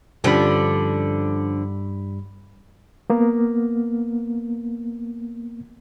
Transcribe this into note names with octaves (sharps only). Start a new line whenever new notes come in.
G2 D3 F3 G3 C#4 B5
A#3 B3